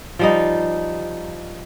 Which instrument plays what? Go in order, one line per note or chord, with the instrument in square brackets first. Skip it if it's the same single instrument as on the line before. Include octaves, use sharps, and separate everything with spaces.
[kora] F3 G3 D#4